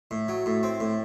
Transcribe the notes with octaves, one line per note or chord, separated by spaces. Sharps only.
A2
F#3
A2
C4
A2